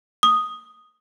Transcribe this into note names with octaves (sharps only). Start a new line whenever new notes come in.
D#6